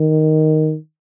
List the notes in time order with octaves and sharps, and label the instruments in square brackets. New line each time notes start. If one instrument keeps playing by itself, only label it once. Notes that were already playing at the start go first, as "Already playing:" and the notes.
Already playing: [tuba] D#3